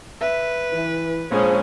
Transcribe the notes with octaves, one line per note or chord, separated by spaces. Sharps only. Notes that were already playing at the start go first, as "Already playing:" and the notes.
B4 E5
E3
A#1 F3 G#3 C#4 G#4 C5